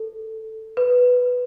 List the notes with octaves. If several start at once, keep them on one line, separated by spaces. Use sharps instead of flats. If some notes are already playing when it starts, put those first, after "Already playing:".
Already playing: A4
B4